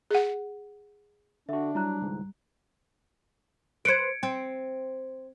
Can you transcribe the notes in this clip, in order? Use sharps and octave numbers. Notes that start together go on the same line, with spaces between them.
G#4 F#5
D3 D4 F#4 E5
F#3 G3 E4 A#5 F#6
G#1 C#2 G#2
B4 C5 G#6 C#7 D7
C4